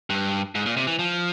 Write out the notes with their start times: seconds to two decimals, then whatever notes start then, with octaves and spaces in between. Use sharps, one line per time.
0.10 G2
0.55 G#2
0.66 A#2
0.77 C3
0.87 E3
0.99 F3